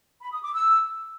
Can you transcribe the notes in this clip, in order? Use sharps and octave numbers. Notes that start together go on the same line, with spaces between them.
B5
D#6
D6
E6